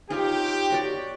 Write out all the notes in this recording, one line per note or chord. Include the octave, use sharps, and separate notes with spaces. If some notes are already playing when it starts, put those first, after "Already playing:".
D#4 F4 G4 C#5
F#4 C#5 D5